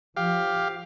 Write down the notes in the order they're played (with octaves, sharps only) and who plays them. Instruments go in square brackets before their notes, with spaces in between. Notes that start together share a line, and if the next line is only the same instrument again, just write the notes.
[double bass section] F3 [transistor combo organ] G4 F5